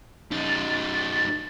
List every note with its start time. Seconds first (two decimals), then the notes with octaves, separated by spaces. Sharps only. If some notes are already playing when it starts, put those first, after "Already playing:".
0.31 F#2 D#4 A6